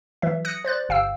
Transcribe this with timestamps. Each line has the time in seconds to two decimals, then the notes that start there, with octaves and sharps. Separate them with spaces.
0.22 E3 F#3 E5
0.45 D#6 F#6 A#6 C#7
0.65 C5 D5 F#6 A6
0.89 G1 F5 G5 E6